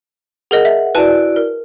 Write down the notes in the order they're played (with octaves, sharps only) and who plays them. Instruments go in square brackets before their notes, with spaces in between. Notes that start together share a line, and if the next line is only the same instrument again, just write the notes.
[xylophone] G#4 A#4 D#5 [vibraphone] F#5
[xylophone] E5
[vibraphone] E4 F#4 D5 [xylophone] B4 G#5 A5
[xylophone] A#4